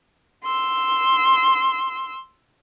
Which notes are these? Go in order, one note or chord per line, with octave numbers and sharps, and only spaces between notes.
C6 E6